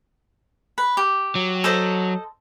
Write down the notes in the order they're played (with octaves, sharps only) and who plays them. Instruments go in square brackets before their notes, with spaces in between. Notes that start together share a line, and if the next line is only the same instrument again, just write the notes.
[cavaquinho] B4
G4
[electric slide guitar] F#3
[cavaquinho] A4 C5 D#5